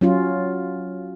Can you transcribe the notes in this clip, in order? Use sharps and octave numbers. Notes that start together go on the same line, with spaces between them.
F#3 C#4 F4